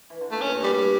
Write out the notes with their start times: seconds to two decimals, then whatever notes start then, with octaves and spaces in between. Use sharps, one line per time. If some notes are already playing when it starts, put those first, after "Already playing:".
0.10 E3
0.21 D3
0.31 A#2 A3
0.41 G2 C#4
0.52 G2
0.60 A2 G3
0.67 G2
0.73 G3